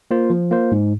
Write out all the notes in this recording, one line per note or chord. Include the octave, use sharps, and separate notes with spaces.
A#3 F4 C5
F3
A#3 F4 C5
G#2